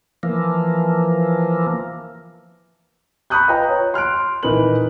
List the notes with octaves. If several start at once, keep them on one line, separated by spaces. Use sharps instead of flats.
E3 F3 A#3
A#5 B5 C#6 D#6 F#6 G6
F4 B4 D#5 G5 A#5
C#5
C6 F6 F#6 D7
D#1 E3 D#4 A#4 B4 F#7